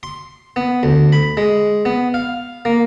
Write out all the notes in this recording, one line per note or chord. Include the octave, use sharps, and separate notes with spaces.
C6
B3
D2
B5
G#3
B3
F5
A#3